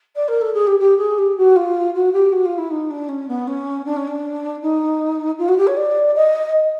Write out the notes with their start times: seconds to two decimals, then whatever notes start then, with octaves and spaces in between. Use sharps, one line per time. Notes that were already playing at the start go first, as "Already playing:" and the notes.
0.15 D5
0.28 A#4
0.41 A4
0.54 G#4
0.67 G4
0.79 G4
0.98 G#4
1.18 G4
1.37 F#4
1.56 F4
1.94 F#4
2.13 G4
2.32 F#4
2.45 F4
2.58 E4
2.70 D#4
2.90 D4
3.08 C#4
3.28 B3
3.47 C#4
3.85 D4
3.96 C#4
4.07 D4
4.62 D#4
5.38 F4
5.48 F#4
5.58 G4
5.67 C#5
5.76 D5
6.15 D#5